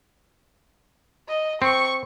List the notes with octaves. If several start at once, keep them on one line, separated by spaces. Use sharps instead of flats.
D#5
C4 C#6